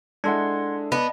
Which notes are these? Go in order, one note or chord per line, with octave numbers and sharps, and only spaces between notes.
G#3 D4 E4 A4 F#5 C6 G#6
B3 D5 D#5 A5